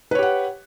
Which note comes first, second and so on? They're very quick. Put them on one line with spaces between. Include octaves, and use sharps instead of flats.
B4 C#5 G4 F#5